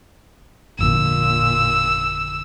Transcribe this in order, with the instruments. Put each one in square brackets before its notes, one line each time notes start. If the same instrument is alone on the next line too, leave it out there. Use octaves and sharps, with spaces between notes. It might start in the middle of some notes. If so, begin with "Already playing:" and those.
[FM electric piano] G#1 F2 D3 [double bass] A#2 [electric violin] E6